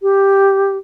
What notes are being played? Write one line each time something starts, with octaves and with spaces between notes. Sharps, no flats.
G4